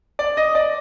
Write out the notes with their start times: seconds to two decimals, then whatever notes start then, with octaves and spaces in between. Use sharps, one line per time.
0.19 D5
0.37 D#5
0.55 D5